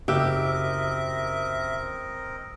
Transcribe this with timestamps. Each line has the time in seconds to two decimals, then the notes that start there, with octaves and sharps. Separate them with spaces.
0.08 F#1 C4 G4 A#4 D#5 E5 E6 D7